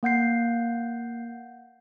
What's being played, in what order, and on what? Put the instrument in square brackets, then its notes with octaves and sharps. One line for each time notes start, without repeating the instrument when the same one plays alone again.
[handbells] A#3 F#5 G6 C7